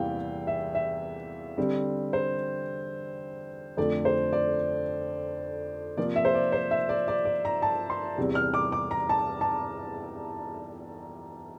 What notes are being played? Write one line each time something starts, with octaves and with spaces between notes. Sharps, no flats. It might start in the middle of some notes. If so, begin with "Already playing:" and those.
Already playing: E2 C3 E3 G3 A#3 F5 G5
E5
E5
D3 G3 C4
C5
F2 D3 A3 D5
C5
D5
C3 F3 A#3 F4 D5
E5
C5
D5
C5
E5
D5
D5
D5
A#5
A5
C6
E2 C3 G3 C4
F6
D6
D6
A#5
A5
A5